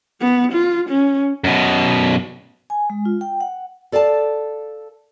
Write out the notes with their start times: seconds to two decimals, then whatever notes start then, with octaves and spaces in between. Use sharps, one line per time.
0.21 B3
0.52 F4
0.89 C#4
1.44 F#2 B2
2.70 G#5
2.90 G#3
3.05 F4
3.21 G5
3.41 F#5
3.92 A4 D5 F5 F#5 A5